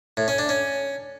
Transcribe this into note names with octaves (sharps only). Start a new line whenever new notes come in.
A2
C#4
D4
C#4